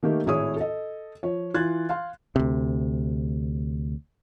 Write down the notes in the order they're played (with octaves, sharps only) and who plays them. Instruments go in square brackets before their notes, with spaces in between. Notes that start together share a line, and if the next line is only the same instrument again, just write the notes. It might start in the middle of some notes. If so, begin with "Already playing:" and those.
[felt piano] D#3 A3 A#3 D#4 G4
G#1 A2 E4 G#4 C#5 D#6
A4 D#5
F3 C#5
E3 F4 F#6 G#6 A6
F5 C6
[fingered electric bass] D2 C3